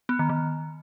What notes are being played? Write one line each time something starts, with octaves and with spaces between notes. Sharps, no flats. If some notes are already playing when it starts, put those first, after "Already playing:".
B3
D#3
D#3